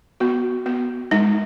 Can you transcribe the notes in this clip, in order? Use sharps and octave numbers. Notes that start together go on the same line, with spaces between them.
B3 F#4
B3
G#3 D#4